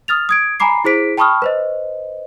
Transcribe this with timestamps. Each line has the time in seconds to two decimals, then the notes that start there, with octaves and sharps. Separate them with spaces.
0.08 D#6 F6 A6 F7
0.29 D#6 G#6 D7
0.60 G#5 A#5 B5 D6 C7
0.84 E4 G#4 C5 B6 D7
1.17 G5 A5 B5 C#6 D#6 F6
1.42 B4 C5 D#5